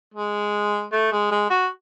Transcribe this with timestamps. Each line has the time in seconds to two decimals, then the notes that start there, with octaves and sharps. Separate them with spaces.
0.14 G#3
0.92 A3
1.12 G#3
1.31 G#3
1.50 F#4